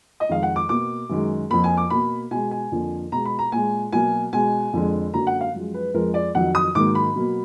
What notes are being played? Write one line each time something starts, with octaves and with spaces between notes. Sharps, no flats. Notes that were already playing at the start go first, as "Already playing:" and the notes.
D#5
F2 D#3 G#3 F5
F#5
D6
B2 A#3 D6
F#2 D#3 G#3
F2 F3 A#3 B5
G#5
D6
B2 A#3 B5
B2 G#3 G#5
G#5
F2 D3 F3 A#3
B2 G#3 A#5
B5
A#5
A#2 G#3 G#5
B2 F#3 A#3 G#5
B2 G#3 G#5
F2 D3 G#3
F#2 D3 F#3 A#3 A#5
F#5
F5
F#2 F3 G#3
B4
F2 F3 G#3 A#4
D5
F2 D#3 F#3 F#5
D#6
G#2 D#3 F#3 A#3 D6
B5
B2 F#3 A#3